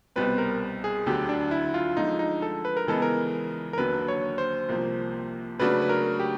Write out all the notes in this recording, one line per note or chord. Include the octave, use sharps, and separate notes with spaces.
C2 B2 G3 C4 B4
A#4
G#4
D2 D3 F#3 G4
D4
E4
F4
D3 F3 G#3 D#4
D#4
A4
B4
A#4
C#3 E3 G#3 B3 A4
A#4
A#4
D#2 D3 F#3 B4
C#5
C5
C2 C3 F3 A#3
C#3 F#3 A3 D4 F#4 B4
B4
A#4
G4